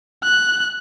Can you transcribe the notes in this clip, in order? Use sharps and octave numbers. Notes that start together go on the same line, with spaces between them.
F#6